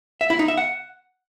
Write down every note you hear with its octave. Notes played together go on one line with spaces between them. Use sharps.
E5
E4
D#4
E5
F#5